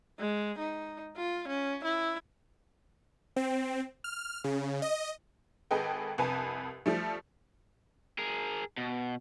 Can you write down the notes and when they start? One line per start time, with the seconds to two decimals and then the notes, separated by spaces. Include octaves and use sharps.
0.19 G#3
0.59 D#4
1.16 F4
1.48 C#4
1.84 E4
3.36 C4
4.04 F6
4.44 C#3
4.82 D#5
5.71 G#1 G#4 A4 B4 D#5 G5
6.18 C2 F2 B4 G#5 A5
6.86 F3 G3 A3
8.18 G#4 A#4
8.77 B2